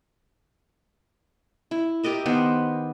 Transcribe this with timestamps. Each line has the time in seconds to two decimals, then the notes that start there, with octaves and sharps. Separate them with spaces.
1.71 E4
2.03 G4 A#4 D#5 E5
2.26 D#3 B3 C5